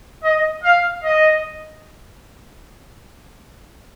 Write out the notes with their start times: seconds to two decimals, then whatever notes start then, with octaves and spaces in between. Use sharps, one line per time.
0.24 D#5
0.63 F5
1.04 D#5